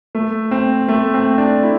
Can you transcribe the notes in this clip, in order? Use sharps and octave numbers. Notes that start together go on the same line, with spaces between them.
A3
C4
A3
C4
D4
E4